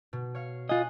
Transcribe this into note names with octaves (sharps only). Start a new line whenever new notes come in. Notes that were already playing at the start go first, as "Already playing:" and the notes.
B2
C#5 F5
F4 D#5 G#5 F#6